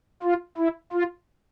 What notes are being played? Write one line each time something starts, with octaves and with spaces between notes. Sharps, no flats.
F4
E4
F4